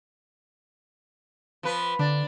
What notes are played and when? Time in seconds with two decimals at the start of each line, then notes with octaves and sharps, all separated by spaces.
1.63 F3 B4
1.99 D3 D4